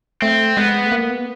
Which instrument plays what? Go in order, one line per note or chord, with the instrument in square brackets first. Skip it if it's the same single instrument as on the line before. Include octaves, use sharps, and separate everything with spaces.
[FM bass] A3 [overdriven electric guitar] C4
[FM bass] G#3 [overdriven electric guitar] B3
[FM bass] A3
A#3
B3